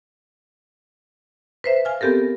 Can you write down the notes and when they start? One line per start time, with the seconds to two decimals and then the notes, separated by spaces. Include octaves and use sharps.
1.64 B4 C5 E5
1.85 F5 G#5 F6
2.01 B3 C4 G4 A4 A#4